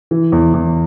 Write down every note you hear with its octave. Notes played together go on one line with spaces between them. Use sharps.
E3
E2
E2